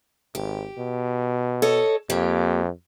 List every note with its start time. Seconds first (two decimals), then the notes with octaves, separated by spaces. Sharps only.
0.35 G#1 G4
0.78 B2
1.62 A4 C#5 D#5
2.10 F2 A#3 G4